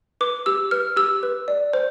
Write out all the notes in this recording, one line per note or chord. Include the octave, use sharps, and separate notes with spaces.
B4 D6
G4 E6
B4 F6
G4 E6
B4
D5
C5